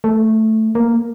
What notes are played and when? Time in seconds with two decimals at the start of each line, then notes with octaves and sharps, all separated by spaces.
0.04 A3
0.75 A#3